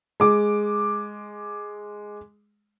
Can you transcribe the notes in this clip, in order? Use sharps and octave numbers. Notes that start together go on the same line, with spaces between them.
G#3 D6